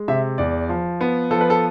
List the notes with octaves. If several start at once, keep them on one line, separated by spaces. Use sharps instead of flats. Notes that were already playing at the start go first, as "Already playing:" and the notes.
Already playing: G#3
C3 E5
E2 D5
F3
B3
F3 A4
B4
A4